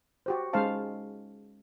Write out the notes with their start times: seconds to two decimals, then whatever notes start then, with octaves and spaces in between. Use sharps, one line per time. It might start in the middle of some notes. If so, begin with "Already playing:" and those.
0.26 F#4 G4 C5
0.53 G#3 C#4 D#4 C5 F5 A5